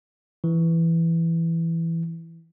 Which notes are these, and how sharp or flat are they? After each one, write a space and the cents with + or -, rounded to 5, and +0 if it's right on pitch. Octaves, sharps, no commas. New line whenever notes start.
E3 +5